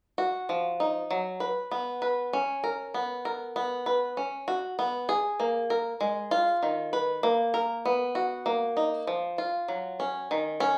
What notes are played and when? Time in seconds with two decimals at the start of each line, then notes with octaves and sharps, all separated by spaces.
0.18 F#4
0.49 F3
0.80 D#4
1.11 F#3
1.40 B4
1.71 B3
2.02 B4
2.33 C#4
2.64 A#4
2.94 B3
3.25 A#4
3.56 B3
3.86 B4
4.17 C#4
4.48 F#4
4.79 B3
5.09 G#4
5.40 A#3
5.70 A#4
6.01 G#3
6.31 F4
6.63 D#3
6.93 B4
7.23 A#3
7.54 A#4
7.85 B3
8.15 F#4
8.46 A#3
8.77 D#4
9.07 F3
9.38 F4
9.68 F#3
10.00 C#4
10.31 D#3
10.60 C#4